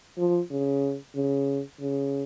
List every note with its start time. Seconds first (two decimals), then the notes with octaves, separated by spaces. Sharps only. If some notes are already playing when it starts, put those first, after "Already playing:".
0.18 F3
0.51 C#3
1.15 C#3
1.81 C#3